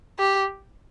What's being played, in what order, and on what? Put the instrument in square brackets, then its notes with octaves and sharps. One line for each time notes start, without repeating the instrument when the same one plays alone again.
[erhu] G4